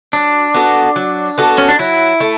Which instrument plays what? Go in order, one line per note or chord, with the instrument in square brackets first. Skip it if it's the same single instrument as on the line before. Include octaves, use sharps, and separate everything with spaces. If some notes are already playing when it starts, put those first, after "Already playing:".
[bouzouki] F#3 [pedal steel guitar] D4
[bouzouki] B3 F#4 A4
F#3
B3 F#4 A4
[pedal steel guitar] C#4
D4
[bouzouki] F#3 [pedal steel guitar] E4
[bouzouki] A3